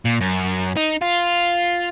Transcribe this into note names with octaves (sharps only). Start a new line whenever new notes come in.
A#2
F#2
D#4
F4